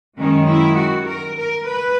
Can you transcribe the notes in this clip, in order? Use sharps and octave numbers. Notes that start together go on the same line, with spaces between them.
F#2 D#3 G#3 C#4
E4
F#4
A#4
A#4
B4